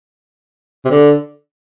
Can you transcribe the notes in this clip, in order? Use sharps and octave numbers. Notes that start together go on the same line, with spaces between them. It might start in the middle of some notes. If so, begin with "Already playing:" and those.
C3
D3